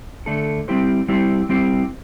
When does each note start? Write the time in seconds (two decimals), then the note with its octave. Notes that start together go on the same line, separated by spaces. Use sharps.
0.26 D3 A3 D4 A4
0.68 G3 C4 E4 G4 C5
1.08 G3 C4 E4 G4 C5
1.49 G3 C4 E4 G4 C5